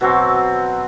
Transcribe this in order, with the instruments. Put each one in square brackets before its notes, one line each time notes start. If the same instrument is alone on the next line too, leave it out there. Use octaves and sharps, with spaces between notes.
[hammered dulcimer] B2 F#3 C4